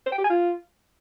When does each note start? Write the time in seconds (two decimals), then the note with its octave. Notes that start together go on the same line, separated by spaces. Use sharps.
0.06 C5
0.12 G5
0.18 G4
0.24 G#5
0.30 F4